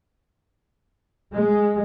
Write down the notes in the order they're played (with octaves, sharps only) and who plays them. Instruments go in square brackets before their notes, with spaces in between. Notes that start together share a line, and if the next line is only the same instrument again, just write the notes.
[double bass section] G#3